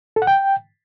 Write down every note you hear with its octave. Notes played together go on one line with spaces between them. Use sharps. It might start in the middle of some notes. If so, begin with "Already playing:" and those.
A4
F#5
G5